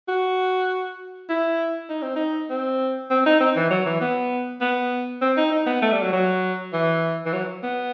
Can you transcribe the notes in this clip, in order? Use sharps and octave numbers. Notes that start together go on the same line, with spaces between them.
F#4
E4
D#4
C4
D#4
C4
C4
D#4
C4
E3
F#3
E3
B3
B3
C4
D#4
D#4
B3
A3
G3
F#3
F#3
E3
E3
F#3
B3